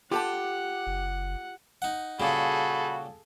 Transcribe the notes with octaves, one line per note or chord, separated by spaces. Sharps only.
F4 G4 A4 F#5 A5
F#1
D#4 F#5
A#2 C#3 G3 F#4 G#4 A4 B5